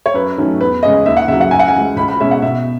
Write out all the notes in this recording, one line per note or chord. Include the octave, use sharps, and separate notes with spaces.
C#5
F#2 B4
D#3 F#3 A3 C#4
E2 B4
C#3 G#3 C#4 D#5
D#2 E5
F#5
C#3 F#3 E5
F#5
F#2 G#5
F#5
G#5
E3 G#3
C#2 B5
B5
B2 G#3 C#4 E5
F#5
B2 E5